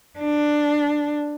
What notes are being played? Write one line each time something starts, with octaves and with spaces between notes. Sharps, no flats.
D4